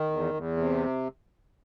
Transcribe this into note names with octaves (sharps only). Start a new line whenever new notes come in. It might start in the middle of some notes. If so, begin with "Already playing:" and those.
Already playing: D#3
E2
E2
C3